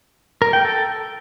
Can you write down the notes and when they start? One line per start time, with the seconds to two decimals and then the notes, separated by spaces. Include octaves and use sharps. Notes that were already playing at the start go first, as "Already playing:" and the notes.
0.42 A#4
0.53 G5
0.65 A4